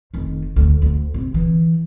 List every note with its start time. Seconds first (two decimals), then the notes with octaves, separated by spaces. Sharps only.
0.14 F1 D#3
0.56 D2
0.82 D2
1.14 C3
1.34 E3